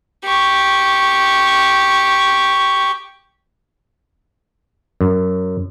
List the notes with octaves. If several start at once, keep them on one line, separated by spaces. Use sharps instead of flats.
G4 C#6
F#2